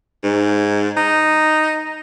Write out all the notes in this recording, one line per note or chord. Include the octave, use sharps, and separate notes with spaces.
G#2
D#4